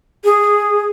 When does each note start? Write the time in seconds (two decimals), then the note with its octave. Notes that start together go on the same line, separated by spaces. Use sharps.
0.24 G#4